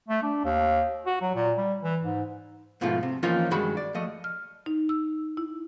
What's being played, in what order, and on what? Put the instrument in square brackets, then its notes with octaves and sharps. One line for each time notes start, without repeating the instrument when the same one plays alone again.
[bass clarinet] A3
D4
D#2
F#4
F#3
A#2
G3
E3
G#2
[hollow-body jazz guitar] G#2 B2 F3 A3 F4
C3
E3 F3 A#3 C#4 D#4 F4
G2 D#3 G#3 F#4 B5
D5
F3 A3 D#5
[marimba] F6
D#4
E6
E4